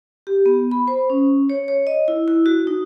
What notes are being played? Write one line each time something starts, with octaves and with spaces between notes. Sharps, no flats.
G4
B3
B5
C5
C#4
C#5
C#5
D#5
E4
E4
F#4
D#4